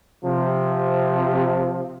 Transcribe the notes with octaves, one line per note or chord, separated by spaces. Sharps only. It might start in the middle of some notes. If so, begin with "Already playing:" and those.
C3 F3